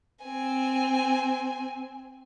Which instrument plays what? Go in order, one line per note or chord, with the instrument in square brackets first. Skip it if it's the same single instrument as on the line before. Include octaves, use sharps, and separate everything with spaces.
[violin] C4 G#5